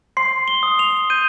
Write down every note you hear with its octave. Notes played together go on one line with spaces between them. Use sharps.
C6 C7
G7
D#6
F7
G6 D#7